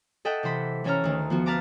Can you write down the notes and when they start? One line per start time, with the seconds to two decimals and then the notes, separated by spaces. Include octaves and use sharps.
0.25 A4 D#5 E5 F#5 G5
0.43 C3 E3 C5 B5
0.84 E3 C#4 A4 C#5 A#5 F6
1.04 D2 D#3
1.30 F3 B3 F#4
1.46 B4 F5 A5 A#5 D6